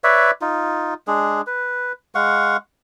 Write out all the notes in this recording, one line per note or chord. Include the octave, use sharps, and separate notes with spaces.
B4 C#5 D5 E5
D#4 F4
G#3 D4 G#4
B4
G#3 F5 F#5 C#6